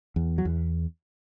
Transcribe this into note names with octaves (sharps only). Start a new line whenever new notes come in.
E2
F#3
E2